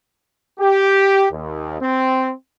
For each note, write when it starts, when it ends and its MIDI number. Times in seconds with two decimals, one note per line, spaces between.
0.59 1.25 67
1.31 1.80 39
1.80 2.31 60